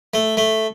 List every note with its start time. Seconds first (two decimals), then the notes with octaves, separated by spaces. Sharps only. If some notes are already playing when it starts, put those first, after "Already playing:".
0.14 A3
0.37 A3